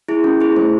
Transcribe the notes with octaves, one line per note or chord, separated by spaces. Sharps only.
E4 G#4
C#4
E4 G#4
A3 C5